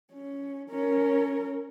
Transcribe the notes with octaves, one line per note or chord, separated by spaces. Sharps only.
C#4
C#4 A#4